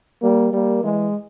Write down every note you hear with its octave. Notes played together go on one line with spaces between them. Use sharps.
G3 A#3
G3 A#3
E3 G#3